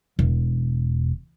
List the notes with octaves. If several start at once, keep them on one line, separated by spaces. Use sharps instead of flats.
E1